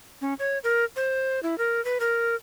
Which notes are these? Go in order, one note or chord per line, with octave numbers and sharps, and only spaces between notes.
C#4
C#5
A#4
C5
E4
A#4
B4
A#4